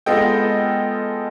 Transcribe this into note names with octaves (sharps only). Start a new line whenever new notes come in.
G#3 B3 F4 A4 D#5 G5